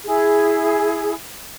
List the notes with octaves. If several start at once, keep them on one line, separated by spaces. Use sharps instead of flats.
E4 G#4